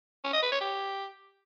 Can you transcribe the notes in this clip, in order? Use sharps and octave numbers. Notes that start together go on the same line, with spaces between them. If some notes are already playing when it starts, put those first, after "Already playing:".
C#4
D#5
B4
C#5
G4